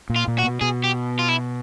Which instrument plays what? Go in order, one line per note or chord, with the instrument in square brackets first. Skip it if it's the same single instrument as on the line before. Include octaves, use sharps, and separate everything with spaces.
[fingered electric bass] A#2
[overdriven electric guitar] F4
[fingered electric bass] A#2
[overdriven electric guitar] F#4
[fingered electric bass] B2
[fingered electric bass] B2 [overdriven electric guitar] G#4
[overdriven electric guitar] G4
F4
E4